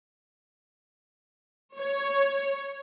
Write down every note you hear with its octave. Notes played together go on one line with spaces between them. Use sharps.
C#5